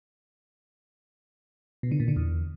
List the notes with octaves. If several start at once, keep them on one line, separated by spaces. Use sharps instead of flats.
B2
D3
A#2
D3
E2